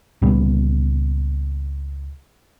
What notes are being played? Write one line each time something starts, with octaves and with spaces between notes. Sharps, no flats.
C#2 A#2 G3 B3